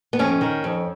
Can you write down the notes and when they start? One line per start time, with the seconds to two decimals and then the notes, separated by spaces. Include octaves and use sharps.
0.13 B3
0.19 F2 C#4
0.41 D#3
0.64 F2